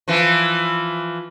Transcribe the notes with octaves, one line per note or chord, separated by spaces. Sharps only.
E3 F3